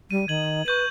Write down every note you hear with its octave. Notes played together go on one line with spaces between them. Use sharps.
G3 D#7
D#3 G#6 F#7
B4 C#6 G6 D#7